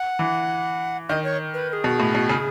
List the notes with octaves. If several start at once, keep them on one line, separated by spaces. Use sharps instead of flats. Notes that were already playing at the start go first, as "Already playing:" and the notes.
Already playing: F#5
E3
D#3 D#5
C#5
B4
B4
G#4
B2
A2
B2
C#3